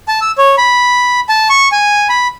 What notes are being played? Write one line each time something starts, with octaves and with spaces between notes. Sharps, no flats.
A5
E6
C#5
B5
A5
C#6
G#5
B5